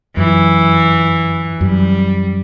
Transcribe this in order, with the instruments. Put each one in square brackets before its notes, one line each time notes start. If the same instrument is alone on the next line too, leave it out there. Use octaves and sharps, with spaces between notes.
[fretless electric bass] F#2 [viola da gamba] E3
[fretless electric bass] F#2 [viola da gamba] G3